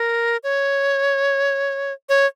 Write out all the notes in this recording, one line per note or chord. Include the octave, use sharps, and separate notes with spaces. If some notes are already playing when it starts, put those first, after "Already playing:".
Already playing: A#4
C#5
C#5